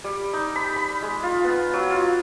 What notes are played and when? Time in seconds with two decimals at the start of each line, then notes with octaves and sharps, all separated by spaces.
0.04 G3
0.33 D#4
0.56 B5
0.76 B5
1.02 G#3
1.23 F4
1.44 B3
1.73 F#3
1.91 F4